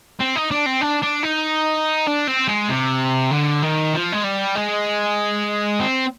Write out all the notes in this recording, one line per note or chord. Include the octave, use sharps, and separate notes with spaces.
C4
D#4
D4
C4
D4
D4
D#4
D4
C4
G#3
C3
D3
D#3
F3
G#3
G3
G#3
C4